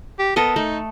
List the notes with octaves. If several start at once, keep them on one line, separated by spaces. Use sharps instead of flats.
G4
B3 A4 A#4 D#5
A3 D#4